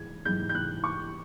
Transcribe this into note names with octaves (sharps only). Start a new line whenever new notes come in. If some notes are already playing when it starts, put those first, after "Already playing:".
Already playing: G#2 E3 G#6
G#2 E3 G6
G6
F#6
C#6